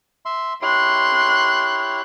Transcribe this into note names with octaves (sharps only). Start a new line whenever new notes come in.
E5 C6
E4 G4 C#5 C6 F#6